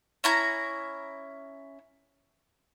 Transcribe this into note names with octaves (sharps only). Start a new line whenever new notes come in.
C#4 E4 A#5